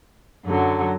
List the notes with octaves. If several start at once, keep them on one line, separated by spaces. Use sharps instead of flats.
F#2 D3 F#3